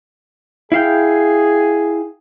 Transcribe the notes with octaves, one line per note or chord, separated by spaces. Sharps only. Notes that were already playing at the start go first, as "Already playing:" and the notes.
E4 G#4 F5 G5